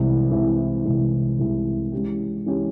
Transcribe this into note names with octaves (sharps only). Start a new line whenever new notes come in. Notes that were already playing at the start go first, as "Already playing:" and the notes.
Already playing: C2 C3 E3 G#3
C2 C3 E3 G#3
C2 C3 E3 G#3
C2 C3 E3 G#3
E3 G#3 C#4 G4
E3 G#3 C#4 G4